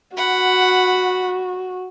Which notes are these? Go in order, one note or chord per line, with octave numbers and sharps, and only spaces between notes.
F#4 F#5 B5